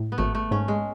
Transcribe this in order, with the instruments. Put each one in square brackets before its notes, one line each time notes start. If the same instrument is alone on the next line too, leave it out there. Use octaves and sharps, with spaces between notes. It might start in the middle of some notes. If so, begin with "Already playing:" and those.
Already playing: [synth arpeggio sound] A2
[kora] B3
[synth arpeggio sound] G#1 [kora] A3
[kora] A3
[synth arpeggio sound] G#2 [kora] C#4
[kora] G#3